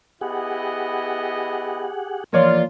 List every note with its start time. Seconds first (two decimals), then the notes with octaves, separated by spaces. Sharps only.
0.21 B3 E4 G4 G#4 D#5 F#5
2.33 E3 F3 A#3 F4 A#4 C#5 D5